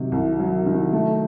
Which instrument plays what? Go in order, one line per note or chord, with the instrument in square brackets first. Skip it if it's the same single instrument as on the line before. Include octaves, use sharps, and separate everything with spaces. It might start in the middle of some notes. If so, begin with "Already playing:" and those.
Already playing: [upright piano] C3 D#3 F#3
C2
F#3
D#3
A3